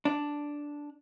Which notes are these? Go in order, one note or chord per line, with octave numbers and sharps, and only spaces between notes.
D4